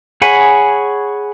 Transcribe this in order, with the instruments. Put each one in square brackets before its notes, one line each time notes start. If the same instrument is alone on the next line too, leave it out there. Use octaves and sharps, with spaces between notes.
[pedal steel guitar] G#4 C#5 F#5 G#5 B5